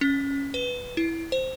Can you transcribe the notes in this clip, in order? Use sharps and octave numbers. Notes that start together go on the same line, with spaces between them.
C#4
B4
E4
C5